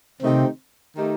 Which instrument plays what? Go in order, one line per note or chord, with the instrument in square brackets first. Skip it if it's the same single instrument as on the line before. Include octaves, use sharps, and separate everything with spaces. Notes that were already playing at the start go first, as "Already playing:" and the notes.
[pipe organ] C3 C4 [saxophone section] D#3 A3 D#4 G4
[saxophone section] D#3 A3 D#4 G4